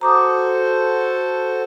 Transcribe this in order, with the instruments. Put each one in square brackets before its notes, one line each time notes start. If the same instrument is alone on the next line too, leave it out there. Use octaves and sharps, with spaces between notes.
[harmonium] F#4 A4 C5 [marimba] A#5 D6 D#6